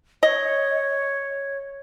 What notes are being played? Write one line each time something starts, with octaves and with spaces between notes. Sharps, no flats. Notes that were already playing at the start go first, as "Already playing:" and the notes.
C#5 D#5